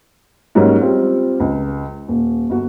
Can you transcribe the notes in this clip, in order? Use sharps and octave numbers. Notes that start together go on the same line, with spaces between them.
G#2 F#3 G3 A#3 C#4
G3 C4 F4
C#2
D#1
G1 F#4